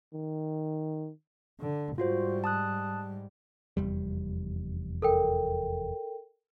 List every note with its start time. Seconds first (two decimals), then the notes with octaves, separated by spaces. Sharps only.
0.14 D#3
1.60 D3
1.98 G#2 G3 F4 F#4 C5
2.44 A5 D#6 F#6
3.77 F1 E2 G3
5.02 A4 A#4 G5